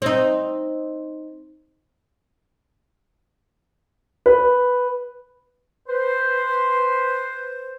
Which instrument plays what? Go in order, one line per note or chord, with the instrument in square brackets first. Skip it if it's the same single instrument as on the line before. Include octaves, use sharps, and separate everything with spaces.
[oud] C4 D#4
[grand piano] B4
[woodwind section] B4 C5